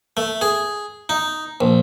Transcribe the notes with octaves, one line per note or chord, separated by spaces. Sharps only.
A3
G#4
D#4
A#1